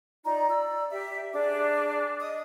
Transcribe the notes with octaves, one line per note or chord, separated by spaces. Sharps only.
D#4 F4 D5 A#5
D5 E6
G4 E5
D4 G#4 D5 D6
D#5 D#6